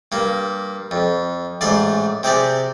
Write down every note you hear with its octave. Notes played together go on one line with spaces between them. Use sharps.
G2 A#3
F2
A1 G#2 D5 C6
C3 G4 G#4 D5